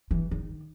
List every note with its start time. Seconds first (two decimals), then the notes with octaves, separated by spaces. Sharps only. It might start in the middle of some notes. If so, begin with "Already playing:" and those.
0.11 E3
0.31 D#3